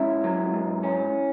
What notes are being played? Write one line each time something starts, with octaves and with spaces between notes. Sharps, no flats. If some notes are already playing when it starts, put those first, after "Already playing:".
Already playing: G#2 C#4 E4 E5
F#3
G#2
C#4